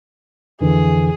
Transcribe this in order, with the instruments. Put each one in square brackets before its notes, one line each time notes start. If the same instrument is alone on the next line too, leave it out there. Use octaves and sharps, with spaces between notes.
[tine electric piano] F2 D3 E3 [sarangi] G#4